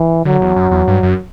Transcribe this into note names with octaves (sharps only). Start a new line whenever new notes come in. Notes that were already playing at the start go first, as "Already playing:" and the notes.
Already playing: E3
D3 F#3
E2
F#2
E2
G2
F#2